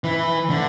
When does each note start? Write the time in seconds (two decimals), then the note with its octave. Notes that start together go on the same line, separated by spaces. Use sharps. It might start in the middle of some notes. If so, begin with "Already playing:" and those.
0.04 E3
0.50 D3